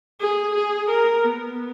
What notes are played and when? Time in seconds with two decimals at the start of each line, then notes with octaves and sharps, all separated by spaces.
0.20 G#4
0.55 G#4
0.90 A#4
1.24 B3